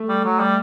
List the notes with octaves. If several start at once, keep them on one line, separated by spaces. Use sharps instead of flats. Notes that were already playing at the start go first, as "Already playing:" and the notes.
Already playing: A3
G3
F#3
G3